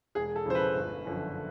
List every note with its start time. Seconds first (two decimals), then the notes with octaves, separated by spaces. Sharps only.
0.15 E1 G#4
0.36 A4
0.45 E2 C#3 F3 C5
0.55 B4
0.75 G1
1.05 F#2 D3 F3